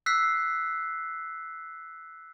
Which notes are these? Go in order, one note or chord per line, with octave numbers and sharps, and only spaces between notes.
E6 F#6 B6 C7